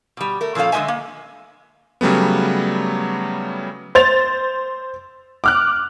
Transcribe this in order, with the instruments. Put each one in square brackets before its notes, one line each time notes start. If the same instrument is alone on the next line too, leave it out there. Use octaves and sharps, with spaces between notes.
[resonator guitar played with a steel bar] B2 G3
A3 A#4
A#2 F3 C#4 A4 F5
D3 G#3 A#3 D#5 E5 G#5
A#3
[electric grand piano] C#3 F#3 G3 A3 B3
[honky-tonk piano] C5 A6 F7
D6 F6 F#6